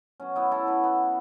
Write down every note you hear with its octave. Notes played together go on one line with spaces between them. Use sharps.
B2 F#3 C#4
B3 E4
E4 A4
F#4 B4
B3